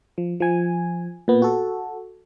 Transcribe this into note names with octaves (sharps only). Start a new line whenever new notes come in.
F3
F3 G#5
A#2 B3
F#4 A4